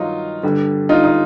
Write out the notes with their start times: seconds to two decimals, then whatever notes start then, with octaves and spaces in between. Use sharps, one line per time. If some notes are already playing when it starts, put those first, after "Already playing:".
Already playing: G2 D#3 F#3 D#4 F4
0.43 G2 D3 G3
0.89 D#4 F4
1.04 D#4